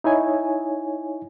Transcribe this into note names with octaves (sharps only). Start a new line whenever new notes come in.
D#4 E4 C#5 G#5